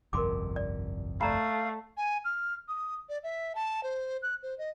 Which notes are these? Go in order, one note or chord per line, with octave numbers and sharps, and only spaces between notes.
G1 C2 F2 A#4 C6 D6
D5
A3 D5 F5 A#5 B5
G#5
F6
D#6
D5
E5
A5
C5
F#6
C5
D#5